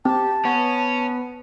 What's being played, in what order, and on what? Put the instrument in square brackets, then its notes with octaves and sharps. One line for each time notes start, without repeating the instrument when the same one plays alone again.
[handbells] C4 [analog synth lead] G4 [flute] A5
[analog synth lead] B3 [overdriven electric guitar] C#4